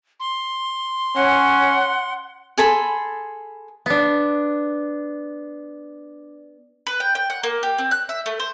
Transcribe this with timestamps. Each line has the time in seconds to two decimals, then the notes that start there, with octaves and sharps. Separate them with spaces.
0.20 C6
1.16 C#4 F#5
2.58 G#4 A4 B5 C6
3.86 B3 D4
6.87 B4
7.00 G5
7.15 G5
7.30 F#5
7.43 A#3
7.63 G4
7.78 C4
7.91 F#6
8.09 E5
8.26 A3
8.40 C5